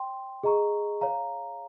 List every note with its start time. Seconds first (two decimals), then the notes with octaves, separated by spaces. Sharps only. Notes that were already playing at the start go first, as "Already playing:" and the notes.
Already playing: C#5 G5 C6
0.43 G#4 D#5 A#5 C#6
1.01 C#5 F5 A#5